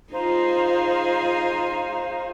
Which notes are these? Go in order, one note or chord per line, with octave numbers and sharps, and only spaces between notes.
D#4 F4 G#4 C5 F5 A#5